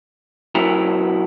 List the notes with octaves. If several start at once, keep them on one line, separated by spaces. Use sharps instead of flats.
B1 F#3 E4 A#4